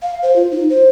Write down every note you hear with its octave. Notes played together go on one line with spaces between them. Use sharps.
F5
C5
F4
D#4
C5